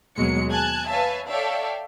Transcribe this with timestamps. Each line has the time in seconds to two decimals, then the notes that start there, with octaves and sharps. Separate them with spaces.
0.16 D#2 B2 F#3 G#3 C#7
0.49 G#5 A5 F#6 G#6
0.89 B4 C#5 E5 F5 G#5 A5
1.29 A4 C#5 D5 E5 F5 G5